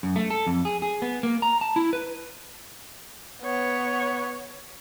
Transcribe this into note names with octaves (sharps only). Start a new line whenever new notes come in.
F#2
A3
A4
F2
G#4
G#4
B3
A#3
A#5
A5
E4
B4
B3 C#5